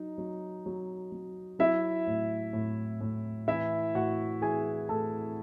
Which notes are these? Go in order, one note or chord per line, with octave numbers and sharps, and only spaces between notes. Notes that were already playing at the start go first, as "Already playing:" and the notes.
Already playing: F#3 D#4 D#5
F#3
F#3
F#3
F#3 E4 E5
A2
A2
A2
E3 E4 E5
A2 F#4 F#5
E3 G#4 G#5
A2 A4 A5